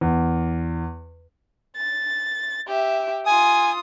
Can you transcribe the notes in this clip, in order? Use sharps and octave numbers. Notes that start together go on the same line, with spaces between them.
E2
A6
G4 E5
F4 G#5 D#6